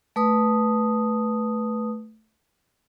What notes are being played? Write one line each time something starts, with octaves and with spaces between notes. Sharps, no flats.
A3 B4 D#6